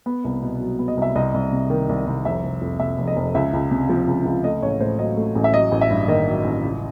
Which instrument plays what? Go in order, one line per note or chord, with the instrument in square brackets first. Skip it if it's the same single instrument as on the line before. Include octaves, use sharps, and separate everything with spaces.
[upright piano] B3
C2
B2
F#3
B3
D#5
C2 E5
C2 D#5
C2
C3
D#3
C2
C2
F1 E5
F1
F2
C3 E5
F1
D#5
F1
C#2 E5
C#2
C3
F3
C#2
C#2
A3 D#5
A1 C#5
A2 C5
F#3 D#5
A3
A1
E5
F#3 D#5
A1
E5
G2
D#3 D#5
F#3
A1
C#2